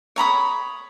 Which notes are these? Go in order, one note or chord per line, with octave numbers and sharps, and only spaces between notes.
C#5 A#5 B5 D#6